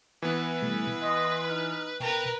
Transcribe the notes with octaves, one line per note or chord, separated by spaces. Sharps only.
E3 B3 B4
B2 G3 A3
D#5 C6
D#4 F6
B2 A#4 B4 G5